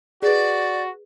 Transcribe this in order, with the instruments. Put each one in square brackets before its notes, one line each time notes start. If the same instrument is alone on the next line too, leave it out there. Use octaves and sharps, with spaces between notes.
[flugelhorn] F#4 [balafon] G#4 B4 [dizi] D5